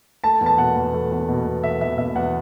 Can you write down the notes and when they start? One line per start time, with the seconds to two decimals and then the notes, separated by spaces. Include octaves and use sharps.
0.24 A3 A5
0.41 E2
0.46 A5
0.58 B2 F#5
0.76 E2
0.94 A3
1.11 E2
1.29 B2
1.45 E2
1.64 A3 E5
1.81 E2 E5
1.98 B2 E5
2.15 E2 F#5